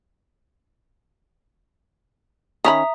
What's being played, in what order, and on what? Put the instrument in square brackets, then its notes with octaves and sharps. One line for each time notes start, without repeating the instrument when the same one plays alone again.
[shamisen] D#3 C#4 B5 [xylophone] E5 A#5 D#6